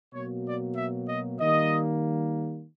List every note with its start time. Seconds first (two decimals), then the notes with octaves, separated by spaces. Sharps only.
0.14 B2 F#3 A#3 C#5
0.46 D5
0.76 E5
1.08 D#5
1.40 D#3 G3 A#3 D#5